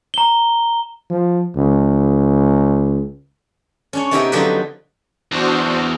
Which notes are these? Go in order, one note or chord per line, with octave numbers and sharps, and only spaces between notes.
A#5 G7
F3
C#2
C#4 D4 C#5
C3 B3 D#4 E4 G4 A#4
D3 F3 F#3 D#4 G4 B4
E2 D4 F#4 C5